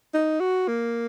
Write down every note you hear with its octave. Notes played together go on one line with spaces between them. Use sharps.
D#4
F#4
A#3